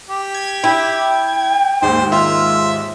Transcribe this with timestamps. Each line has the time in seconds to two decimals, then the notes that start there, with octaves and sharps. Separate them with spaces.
0.10 G4
0.34 G#6
0.64 E4 G5
1.82 D#2 G#2 C5
2.12 F4 E5